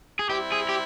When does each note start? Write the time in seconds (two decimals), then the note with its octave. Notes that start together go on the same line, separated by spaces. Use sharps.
0.19 G#4
0.29 G3 C4 E4 G4
0.52 G#4
0.69 G4